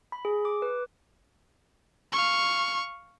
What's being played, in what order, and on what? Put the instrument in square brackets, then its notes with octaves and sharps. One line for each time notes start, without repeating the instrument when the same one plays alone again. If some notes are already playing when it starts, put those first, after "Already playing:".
[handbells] B5
G#4
D6
B4
[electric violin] F5 C#6